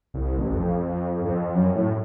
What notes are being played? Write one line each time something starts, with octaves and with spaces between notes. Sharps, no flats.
C2
A1
F2
F2
F#2
A2